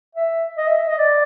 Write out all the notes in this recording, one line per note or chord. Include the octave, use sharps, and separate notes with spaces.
E5
D#5
E5
E5
D#5
D5